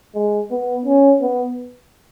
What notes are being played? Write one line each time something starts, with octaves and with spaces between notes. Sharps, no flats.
G#3
B3
C#4
B3